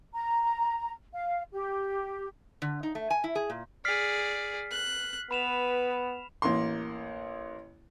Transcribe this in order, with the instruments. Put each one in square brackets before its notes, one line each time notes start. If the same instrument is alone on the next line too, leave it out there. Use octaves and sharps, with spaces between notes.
[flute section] A#5
F5
G4
[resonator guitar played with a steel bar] D3
D#4
A3
G#5
E4
G#4
A#2
[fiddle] G#4 D5 [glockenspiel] F6 B6 C7
[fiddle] F#6
[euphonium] B3 [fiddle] B4 [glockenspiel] B5 E7 F7
[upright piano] A1 A#3 C6